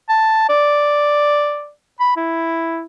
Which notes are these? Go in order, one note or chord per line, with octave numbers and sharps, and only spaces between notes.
A5
D5
B5
E4